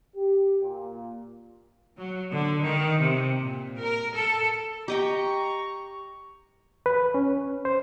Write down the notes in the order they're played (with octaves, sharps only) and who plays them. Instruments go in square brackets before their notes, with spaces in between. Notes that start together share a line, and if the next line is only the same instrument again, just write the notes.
[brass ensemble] G4
A#2
[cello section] F#3
D3
D#3
C3
A#2
A#4
A4
[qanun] G4 D#5 G5 [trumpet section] A#5 C#6
[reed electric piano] B4
C#4
C5